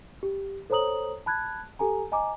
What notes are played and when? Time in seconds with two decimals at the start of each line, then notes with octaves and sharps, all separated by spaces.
0.23 G4
0.70 A4 C5 C#5 A#5 D#6 F#7
1.26 A5 B5 F#6 G#6
1.79 G4 A4 G#5 A#5
2.12 D#5 G#5 A#5 D6